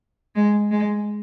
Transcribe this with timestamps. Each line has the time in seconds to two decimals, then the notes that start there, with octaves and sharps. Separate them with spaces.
0.35 G#3
0.71 G#3